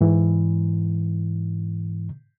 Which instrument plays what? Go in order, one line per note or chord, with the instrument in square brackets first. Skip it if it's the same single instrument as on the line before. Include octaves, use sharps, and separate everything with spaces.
[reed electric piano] G#2 E3